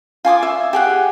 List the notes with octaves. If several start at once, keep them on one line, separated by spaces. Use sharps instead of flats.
F4 G#5 D6 D#6
E5
G4 G#4 F#5